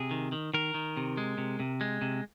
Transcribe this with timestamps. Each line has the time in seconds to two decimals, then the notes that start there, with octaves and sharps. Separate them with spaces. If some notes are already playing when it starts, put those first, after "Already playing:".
Already playing: C3 G#4
0.11 D#3
0.32 D#3
0.54 D#3 A#4
0.74 D#3
0.97 C3
1.17 G#3
1.38 C3
1.60 C3
1.81 G#3
2.02 C3